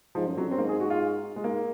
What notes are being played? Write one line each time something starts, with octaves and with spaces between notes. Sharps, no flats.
G#2 F3
F#2
F2 F#3
F#2
C4
G#2 A#3
G#4
F#4
F4
G#3
G#2 A#3